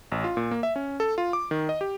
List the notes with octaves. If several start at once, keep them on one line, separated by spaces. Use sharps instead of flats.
A1
F4
A#2
A#3
E5
C#4
A4
F4
D6
D#3
D#5
G4